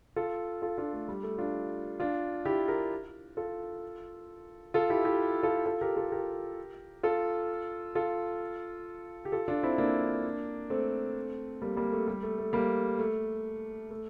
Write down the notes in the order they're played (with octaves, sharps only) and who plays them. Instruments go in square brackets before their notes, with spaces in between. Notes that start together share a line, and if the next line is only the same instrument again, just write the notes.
[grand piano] F4 A4
F4 A4
D4 F4
A3
G3
A3
D4 F4
D4 F4
E4 G4
G4 A#4
F4 A4
F4 A4
E4 G4
E4 G4
F4 A4
F4 A4
G4 A#4
F4 A4
G4 A#4
F4 A4
F4 A4
G4
F4 A4
D4 F4
C4 E4
A#3 D4
A3 C4
G3 A#3
G3 A#3
A3
G3
A3
A3
G3 A#3
A3
A3